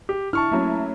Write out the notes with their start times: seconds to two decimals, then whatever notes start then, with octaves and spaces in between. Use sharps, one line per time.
0.09 G4
0.33 D3 E4 A5 C#6 F6
0.51 F#3 A3 A#3 C#4 E4